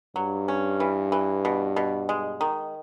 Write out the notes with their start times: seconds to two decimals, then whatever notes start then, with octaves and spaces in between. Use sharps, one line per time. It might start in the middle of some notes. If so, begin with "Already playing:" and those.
0.16 G2 F#3
0.48 C#4
0.80 E3
1.12 E3
1.45 B2
1.76 B2
2.09 G#3
2.41 D#3